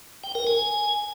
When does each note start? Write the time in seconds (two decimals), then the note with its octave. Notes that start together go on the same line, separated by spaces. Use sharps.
0.24 G5
0.35 A#4
0.47 G#5